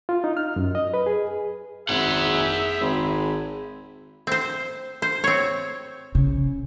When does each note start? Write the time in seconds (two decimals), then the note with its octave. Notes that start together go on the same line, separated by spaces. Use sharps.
0.09 F4
0.24 D#4
0.37 F6
0.56 F#2
0.75 D#5
0.94 B4
1.06 G#4
1.89 G#1 G#4 E5 F#5
2.80 G#1
4.27 C4 C5
5.02 C5
5.24 C4 C#5
6.15 C#3